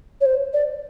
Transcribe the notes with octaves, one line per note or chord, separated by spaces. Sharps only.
C#5
C5
D5